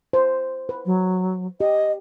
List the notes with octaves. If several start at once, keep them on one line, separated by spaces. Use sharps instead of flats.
C5
B4
F#3
G4 D#5